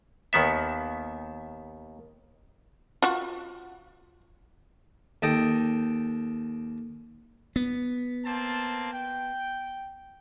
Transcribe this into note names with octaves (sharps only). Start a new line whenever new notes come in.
D#2 D#3 B3 E5
F4 F#4
D#2 A4 D#5 G5
B3
A#3 C4 A5
G5